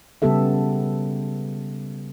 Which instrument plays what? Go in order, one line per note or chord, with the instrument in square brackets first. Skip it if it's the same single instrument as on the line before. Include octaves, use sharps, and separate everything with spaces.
[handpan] C#3 G3 B3 G4 A4 E5